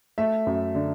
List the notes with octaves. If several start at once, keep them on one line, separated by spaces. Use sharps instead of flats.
A3 E5
F#2
D3